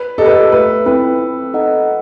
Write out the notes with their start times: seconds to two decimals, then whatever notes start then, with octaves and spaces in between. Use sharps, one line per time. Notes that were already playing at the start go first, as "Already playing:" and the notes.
Already playing: B4
0.18 G4 A4 D#5
0.26 B4
0.33 A4
0.52 A3 B4
0.86 C4 E4 A4 B4
1.20 C4
1.54 D#4 A4 D#5 F#5